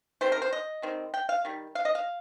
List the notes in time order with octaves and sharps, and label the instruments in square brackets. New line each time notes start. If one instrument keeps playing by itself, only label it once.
[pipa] D#3 G3 C4 C5
A#4
C5
D#5
D#3 G3 C4
G5
F5
D#3 G3
F5
D#5
F5